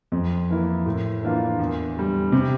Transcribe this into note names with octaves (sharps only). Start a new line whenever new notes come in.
F2
E3 A#3 E4
A2
E3 A#3 D4 F4
E2
D3 G3
C3